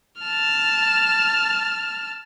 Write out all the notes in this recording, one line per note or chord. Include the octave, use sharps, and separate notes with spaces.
A5 F6